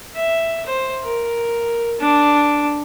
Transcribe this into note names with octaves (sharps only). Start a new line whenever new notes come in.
E5
C5
A#4
D4